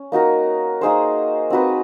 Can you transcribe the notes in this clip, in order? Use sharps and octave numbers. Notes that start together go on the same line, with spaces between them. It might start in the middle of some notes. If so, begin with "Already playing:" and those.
Already playing: C#4
A#3 D#4 F#4 A#4
A#3 D#4 G#4 C5
C4 D#4 F#4 B4